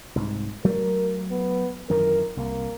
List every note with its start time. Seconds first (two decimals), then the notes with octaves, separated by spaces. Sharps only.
0.15 C2 G#2
0.64 F#3 A3 A#3 A#4
1.31 B3
1.90 F#2 D#3 E3 A#4
2.37 C2 A#3